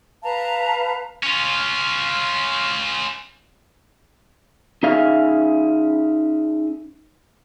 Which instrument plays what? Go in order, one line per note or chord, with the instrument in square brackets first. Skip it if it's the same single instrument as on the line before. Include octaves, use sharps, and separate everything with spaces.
[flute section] B4 F5 A5 A#5
[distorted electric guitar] C#4 F4
[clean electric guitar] C#4 D#4 G#4 E5 F5